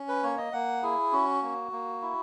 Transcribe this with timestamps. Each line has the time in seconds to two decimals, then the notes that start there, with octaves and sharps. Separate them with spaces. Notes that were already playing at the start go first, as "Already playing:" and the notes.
Already playing: C#4
0.09 B4
0.23 A#3 C#5
0.38 D#5
0.53 A#3 F#5
0.83 E4 G#4
1.12 C#4 F#4
1.42 A#3
1.72 A#3
2.02 E4